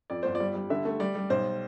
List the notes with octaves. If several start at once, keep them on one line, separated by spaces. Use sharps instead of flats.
F2 D5
G1 C5
D5
G3
G3
D3 E5
A3
G3 D5
G3
B1 C5